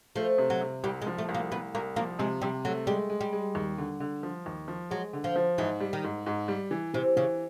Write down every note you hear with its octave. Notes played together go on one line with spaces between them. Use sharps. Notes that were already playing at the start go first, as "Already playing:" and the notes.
F3 A3
C3
F#3
C3
C2 G3
G#3
F3
A3
C2
A#3
C2 B3
C2 A#3
F3 A#3
C3 G#3
C3 G3
F#3 A3
G3 G#3
G#3
G3
G#3
D#2
D3
D3
F3
D#2
F3
F#3 G#3
D3
F3
F3
G#2 E3
G3
D#3
G#2
G#2
G3
E3
C3 E3
C#3 E3